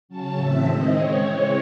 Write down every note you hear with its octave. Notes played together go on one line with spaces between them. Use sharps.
C#3 F#3 C#4 A5
A2 E3 C4 E5
D#3 G#3 C4 D#5
C#3 G#3 C4 C#5
E3 G#3 C4